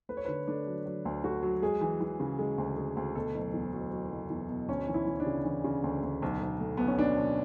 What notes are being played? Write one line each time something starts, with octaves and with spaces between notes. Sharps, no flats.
A3 B4
C#5
D3 B4
A3 D4
F#3
F#3
D2
A3 F#4
F#3
G#3 G#4
E3
E3
C#3
G#3
D2
G#3
D2
B2 A4
F#1
E2
F#3
F#3
F#1
E2
B2
D2 C#4
E3
E4
E3
D4
C#3
E3 D4
C#3
D2
D2
B1
B1
A3
B1 B3
C#4
B2 D4
B1